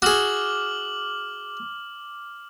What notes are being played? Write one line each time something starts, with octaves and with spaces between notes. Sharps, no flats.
F#4 G#4 D6 F6 F#7